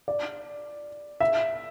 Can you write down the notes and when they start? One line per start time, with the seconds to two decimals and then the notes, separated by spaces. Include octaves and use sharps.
0.08 D5
1.20 E5